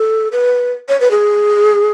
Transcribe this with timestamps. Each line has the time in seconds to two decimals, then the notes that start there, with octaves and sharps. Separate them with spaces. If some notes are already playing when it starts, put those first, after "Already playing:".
Already playing: A4
0.32 B4
0.89 C#5
1.00 B4
1.11 G#4